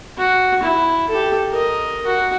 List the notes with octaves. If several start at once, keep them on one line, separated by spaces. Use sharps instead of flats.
F#4
E4
G4 A4
A#4 D#5
F#4